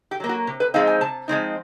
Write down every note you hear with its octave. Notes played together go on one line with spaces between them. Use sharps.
G4
F#3 A#3
F#4
C3
B4
F3 G#3 C4 D#4 F5
G#5
C3 A5
F3 G#3 C4 D#4